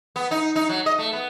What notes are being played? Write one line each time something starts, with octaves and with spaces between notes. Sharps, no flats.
B3
D#4
D#4
F#3
D#5
A3
B3